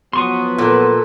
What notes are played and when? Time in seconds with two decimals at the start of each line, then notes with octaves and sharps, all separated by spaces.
0.13 F3 F#3 B3 F#4 C6 C#6 D#6
0.58 A#2 A4 B4